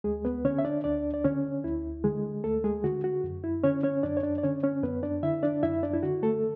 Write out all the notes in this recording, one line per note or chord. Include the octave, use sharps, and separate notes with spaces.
D2 G#3 G#4
B3 B4
D3 C#4 C#5
E5
D4 D5
D2 D4 D5
D5
D3 C#4 C#5
D2 E4
D3 G#3 G#4
D2 A3 A4
G#3 G#4
D3 F#4
F#4
F#2
E4
D3 C#4 C#5
C#4 C#5
F#2 D4 D5
C#5
D4 D5
D5
D3 C#4 C#5
C#4 C#5
F#2 B3 B4
D4 D5
D3 E4 E5
D4 D5
F#2 E4 E5
D4 D5
E4
D3 F#4
A3 A4